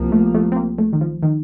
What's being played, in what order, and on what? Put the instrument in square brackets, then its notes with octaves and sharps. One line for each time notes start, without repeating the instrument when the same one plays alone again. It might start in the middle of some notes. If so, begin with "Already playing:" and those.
Already playing: [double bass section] C2 C3 F3 A#3
[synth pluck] A3
A3
C4
A#3
A3
D#3
F3
D#3